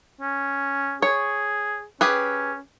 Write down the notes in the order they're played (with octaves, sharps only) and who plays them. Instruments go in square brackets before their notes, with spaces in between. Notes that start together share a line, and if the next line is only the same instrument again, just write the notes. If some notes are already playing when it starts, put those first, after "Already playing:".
[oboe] C#4
[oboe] G#4 [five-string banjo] C#5
[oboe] C#4 [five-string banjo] G4 G#4 B4